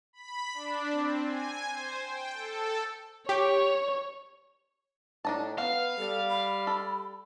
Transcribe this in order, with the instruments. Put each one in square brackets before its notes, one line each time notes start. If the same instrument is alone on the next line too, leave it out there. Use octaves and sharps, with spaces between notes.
[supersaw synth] B5
D4
C4
G#5
C5
G5
A4
[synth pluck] G4 [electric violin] C#5
[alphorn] A2 [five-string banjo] D4 D#4 A5
[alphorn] B3 [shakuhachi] B4 [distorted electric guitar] F5 [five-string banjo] F#5
[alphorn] G3 [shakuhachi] A4
[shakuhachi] B5
[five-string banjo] A4